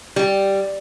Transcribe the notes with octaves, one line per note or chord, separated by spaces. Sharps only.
G3